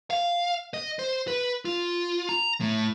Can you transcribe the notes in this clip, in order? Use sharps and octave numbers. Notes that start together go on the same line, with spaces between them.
F5
D#5
C5
B4
F4
A#5
A2